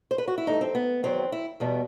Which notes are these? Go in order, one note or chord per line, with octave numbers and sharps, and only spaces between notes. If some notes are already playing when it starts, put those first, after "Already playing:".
C5
B4
F#4
E4
G2 E3 A3 D#4
C4
B3
E2 D#3 F#3 B3 C4
E4
E2 B2 G3 B3